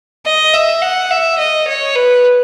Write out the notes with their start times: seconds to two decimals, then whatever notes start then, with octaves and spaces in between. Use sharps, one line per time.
0.26 D#5
0.54 E5
0.82 F#5
1.11 E5
1.39 D#5
1.68 C#5
1.96 B4